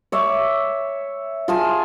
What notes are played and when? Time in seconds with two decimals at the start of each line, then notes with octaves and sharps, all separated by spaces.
0.12 C#5 E5 D6
1.48 F4 G#4 G#5 A5